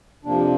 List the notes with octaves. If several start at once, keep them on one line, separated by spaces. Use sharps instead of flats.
F2 C3 F3 A#3 D4